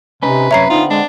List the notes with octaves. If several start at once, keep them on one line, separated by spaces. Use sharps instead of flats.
C3 C#4 D#4 B4
F#2 C3 C#5 E5 A#5 C7
D3 B3 C4 D#4 F4
G#3 D4